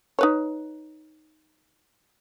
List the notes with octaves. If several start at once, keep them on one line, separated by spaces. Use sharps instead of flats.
D#4 B4 C#5